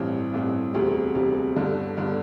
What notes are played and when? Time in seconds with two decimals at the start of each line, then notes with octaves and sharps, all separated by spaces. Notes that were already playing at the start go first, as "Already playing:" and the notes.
Already playing: A1 G2 E3 C4
0.33 A1 G2 E3 C4
0.73 E1 D2 C3 G3
1.15 E1 D2 C3 G3
1.56 G1 G2 D3
1.97 G1 G2 D3